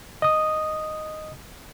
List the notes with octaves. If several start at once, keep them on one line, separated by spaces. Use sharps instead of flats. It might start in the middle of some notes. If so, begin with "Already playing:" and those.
D#5 D#6